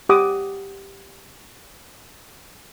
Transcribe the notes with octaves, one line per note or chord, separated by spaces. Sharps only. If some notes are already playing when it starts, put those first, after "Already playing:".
G4 F#5 D6 D#6